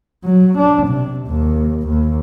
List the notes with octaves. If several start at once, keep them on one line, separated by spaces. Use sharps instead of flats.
F#3
D4
C3
D#2
D#2